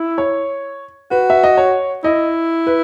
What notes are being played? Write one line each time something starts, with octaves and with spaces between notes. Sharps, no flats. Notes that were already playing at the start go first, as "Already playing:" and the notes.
Already playing: E4
C#5
F#4 B4
E5
D#5
C#5
E4 D#5
B4